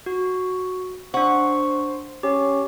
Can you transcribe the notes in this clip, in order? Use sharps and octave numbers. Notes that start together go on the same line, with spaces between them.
F#4
D4 C5 F#5 C#6
C#4 G4